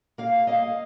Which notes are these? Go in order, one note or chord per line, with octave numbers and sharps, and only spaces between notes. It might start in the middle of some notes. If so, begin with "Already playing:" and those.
A#3 F5
A#3 D#5